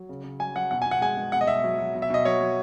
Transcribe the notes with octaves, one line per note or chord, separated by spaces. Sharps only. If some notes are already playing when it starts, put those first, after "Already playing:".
Already playing: F#3
C#3
C#3
F#3 G#5
F#3 F#5
B2 F#5
G#5
B2
F#5
G#3 G#5
G#3
B2 F#5
D#5
B2 E5
F#3
F#3
B2
E5
B2 D#5
F#3 C#5
F#3